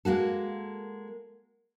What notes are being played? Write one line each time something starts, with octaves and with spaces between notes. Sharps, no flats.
G#3 A#3 F#4 A4